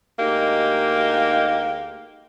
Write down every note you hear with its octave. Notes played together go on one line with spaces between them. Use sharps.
D2 G#3 A#3 D#4 G4